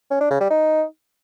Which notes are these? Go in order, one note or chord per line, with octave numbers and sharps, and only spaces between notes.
C#4
D4
C#3
G3
D#4